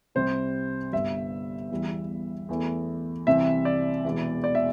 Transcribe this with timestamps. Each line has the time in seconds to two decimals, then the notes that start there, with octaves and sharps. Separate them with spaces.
0.15 C2 C3 G3 C5
0.92 G1 G2 G3 E5
1.71 E2 E3 G3
2.49 E2 E3 A3
3.27 C2 C3 E3 E5
3.65 D5
4.05 E1 E2 E3
4.44 D5
4.55 E5